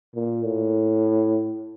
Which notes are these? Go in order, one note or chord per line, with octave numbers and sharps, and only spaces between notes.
A#2
A2